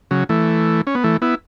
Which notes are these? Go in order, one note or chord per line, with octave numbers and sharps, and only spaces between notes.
C#3 F#3
E3 A3
C#4
B3
E3 A3
B3 E4